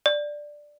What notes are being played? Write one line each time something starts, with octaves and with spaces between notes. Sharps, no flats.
D5